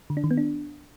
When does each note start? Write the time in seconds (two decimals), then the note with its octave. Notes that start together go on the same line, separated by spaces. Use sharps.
0.10 D3
0.17 D4
0.24 D#3
0.31 B3
0.37 D4